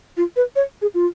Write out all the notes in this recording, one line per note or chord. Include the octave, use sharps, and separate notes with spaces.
F4
B4
C#5
G#4
F4